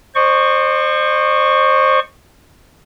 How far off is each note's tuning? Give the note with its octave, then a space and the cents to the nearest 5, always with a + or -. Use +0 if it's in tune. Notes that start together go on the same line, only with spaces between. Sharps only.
C5 +15 D#5 -45 C#6 +0